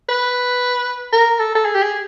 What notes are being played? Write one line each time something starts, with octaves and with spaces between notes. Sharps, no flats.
B4
A#4
A4
A4
G#4
G4
G#4